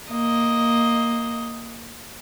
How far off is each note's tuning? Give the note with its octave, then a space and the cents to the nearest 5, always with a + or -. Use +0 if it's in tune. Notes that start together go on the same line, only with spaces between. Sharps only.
A#3 +0 D#5 +5